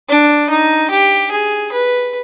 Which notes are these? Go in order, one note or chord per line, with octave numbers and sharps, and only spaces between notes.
D4
D#4
G4
G#4
B4